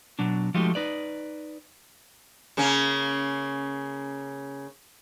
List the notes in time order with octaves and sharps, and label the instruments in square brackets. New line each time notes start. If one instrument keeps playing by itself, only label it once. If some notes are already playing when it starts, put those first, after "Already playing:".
[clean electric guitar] B2 F#3 D4
F3 G#3 A3 D#4 F#4 G4
D#4 B4 D5
[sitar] C#3 A#3 C#4